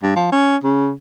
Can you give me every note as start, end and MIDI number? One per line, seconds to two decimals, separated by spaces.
0.03 0.12 43
0.16 0.31 53
0.32 0.56 61
0.64 0.92 49